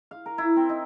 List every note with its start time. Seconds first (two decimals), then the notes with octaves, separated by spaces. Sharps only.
0.11 F5
0.26 A#4
0.38 E4
0.56 C4
0.69 D#4